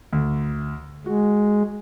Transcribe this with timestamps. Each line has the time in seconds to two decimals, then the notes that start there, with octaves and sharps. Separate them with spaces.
0.13 D2
1.06 G#3 F#4